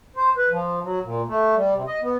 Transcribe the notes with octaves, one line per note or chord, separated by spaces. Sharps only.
C5
B4
F3
F#3
A#2
A3
G3
C3
D#5
B3